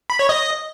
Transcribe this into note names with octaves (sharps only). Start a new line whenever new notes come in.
B5
C#5
D#5